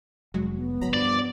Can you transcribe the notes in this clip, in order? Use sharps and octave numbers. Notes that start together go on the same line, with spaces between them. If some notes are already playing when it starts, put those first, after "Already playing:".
F1 F#3 G#3 F#4
B3
D1 G1 F#3 A#5 B5
G2 F3 D5